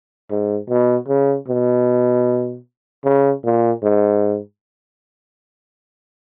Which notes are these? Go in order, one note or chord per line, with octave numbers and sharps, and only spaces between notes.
G#2
B2
C#3
B2
C#3
A#2
G#2